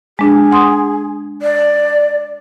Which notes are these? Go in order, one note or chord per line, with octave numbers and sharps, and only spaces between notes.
G#3 D4 G#4
F#5 C6 D#6
D5